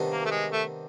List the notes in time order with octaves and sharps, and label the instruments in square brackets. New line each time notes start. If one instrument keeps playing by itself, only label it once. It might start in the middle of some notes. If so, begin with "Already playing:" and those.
Already playing: [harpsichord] C3 D#3 G3 B3 D4
[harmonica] A#3
A3
G#3
A3